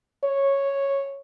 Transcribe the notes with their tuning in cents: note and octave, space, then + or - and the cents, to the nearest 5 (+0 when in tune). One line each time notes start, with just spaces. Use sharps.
C#5 -5